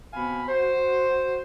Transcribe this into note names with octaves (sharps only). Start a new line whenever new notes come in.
B2 C4 F5 G#5 B5
F#4 C5